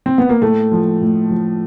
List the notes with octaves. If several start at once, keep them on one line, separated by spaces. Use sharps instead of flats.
C4
B3
A#3
A2 A3
F3
A2
F3